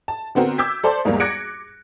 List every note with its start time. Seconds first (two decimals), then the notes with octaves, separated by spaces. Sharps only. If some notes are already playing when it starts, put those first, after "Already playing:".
0.08 A5
0.35 D3 B3 C4 F#4 A#4
0.58 D6 E6 G6 G#6 B6
0.84 A4 C5 D5 A5 C6
1.05 E2 G#2 G3 A#3
1.20 D6 F#6 G#6 A#6 C#7 D7